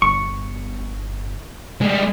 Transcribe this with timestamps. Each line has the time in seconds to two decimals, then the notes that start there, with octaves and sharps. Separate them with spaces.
0.02 G1 C#6
1.81 G3 G#3